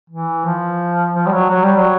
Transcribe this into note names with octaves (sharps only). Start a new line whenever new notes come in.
E3
F3
F3
G3
F#3
F#3
G3
F#3